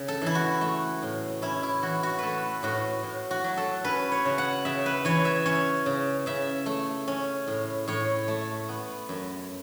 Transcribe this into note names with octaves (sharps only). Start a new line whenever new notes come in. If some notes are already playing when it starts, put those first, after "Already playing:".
Already playing: C#3
A4
E3 E4
F#4
A3
A2
C#4 E4
E4
E3 F#4
F#4
A3 A4 B4
A2 F#4
A2
F#4
F#3
A4
C#4 B4
C#5
C#3
F#5
C#3 E5
B4
E3 C#5
E5
C#4 C#5
C#3
C#3 E5
A3
C#4
A2
A2 C#5
A3
B3
F#2